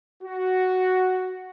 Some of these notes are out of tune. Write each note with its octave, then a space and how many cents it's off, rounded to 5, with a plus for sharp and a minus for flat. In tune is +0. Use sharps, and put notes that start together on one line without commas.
F#4 +5